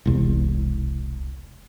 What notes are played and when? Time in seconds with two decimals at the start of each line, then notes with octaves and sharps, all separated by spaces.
0.06 E1 C2